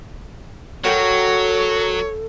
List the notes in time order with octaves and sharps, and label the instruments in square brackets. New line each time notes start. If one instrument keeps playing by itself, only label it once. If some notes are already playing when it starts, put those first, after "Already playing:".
[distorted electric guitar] F#3 [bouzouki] F#4 A#4 G5 [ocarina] A4 [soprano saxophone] C#5